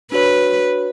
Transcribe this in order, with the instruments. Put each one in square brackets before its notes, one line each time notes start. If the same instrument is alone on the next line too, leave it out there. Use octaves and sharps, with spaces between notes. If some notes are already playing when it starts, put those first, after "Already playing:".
[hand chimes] D4 F#4 C#5 [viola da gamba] B4